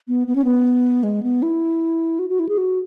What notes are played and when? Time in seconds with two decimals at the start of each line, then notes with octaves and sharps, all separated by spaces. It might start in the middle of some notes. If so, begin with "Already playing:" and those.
0.08 B3
0.27 B3
0.36 C#4
0.45 B3
1.03 G#3
1.23 B3
1.42 E4
2.19 F#4
2.29 F#4
2.39 E4
2.49 G#4
2.58 F#4